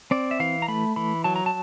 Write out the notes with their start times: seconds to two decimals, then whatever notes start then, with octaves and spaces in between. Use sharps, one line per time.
0.11 C4 D5
0.31 E5
0.40 E3 F5
0.62 A#5
0.68 A3 B5
0.96 E3 B5
1.24 F#3 A5
1.36 A#5
1.46 A5